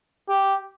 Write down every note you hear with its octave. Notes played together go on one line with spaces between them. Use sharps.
G4